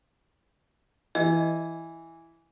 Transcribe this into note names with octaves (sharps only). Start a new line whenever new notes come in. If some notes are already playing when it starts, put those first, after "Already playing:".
E3 D#5